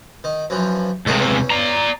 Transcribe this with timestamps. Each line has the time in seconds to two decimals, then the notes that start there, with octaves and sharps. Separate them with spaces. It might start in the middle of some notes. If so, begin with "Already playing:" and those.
0.24 D#3
0.50 F#2 E3 F3
1.07 C#2 C3 A3 A#3 D#4
1.20 E2 C#4
1.50 D5 A#5